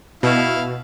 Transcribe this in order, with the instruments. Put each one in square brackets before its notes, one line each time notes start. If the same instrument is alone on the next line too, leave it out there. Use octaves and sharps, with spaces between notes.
[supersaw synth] B2 [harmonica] E4 F5